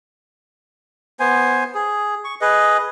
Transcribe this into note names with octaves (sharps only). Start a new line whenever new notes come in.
B3 C5 G#5
G#4
C#6
G#4 B4 D#5